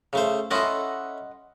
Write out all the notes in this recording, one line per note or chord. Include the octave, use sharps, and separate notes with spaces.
C#3 A3 C5
C#4 E4 A4 D#5 F#5 C6